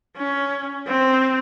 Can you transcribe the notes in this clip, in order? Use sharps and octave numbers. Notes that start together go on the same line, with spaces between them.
C#4
C4